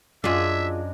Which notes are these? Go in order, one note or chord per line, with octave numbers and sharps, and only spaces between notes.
F#2 D4 F4 G#4 D#5 E5 G#6